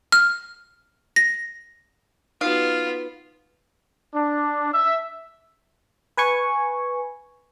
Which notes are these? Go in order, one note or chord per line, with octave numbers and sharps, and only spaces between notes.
F6
A#6
B3 D#4 F4 F#4 F5
D4
E5
B4 G#5 C#6